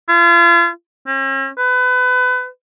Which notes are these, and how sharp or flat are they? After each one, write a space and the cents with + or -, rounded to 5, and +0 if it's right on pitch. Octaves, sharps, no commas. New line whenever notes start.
F4 -40
C#4 -45
B4 +30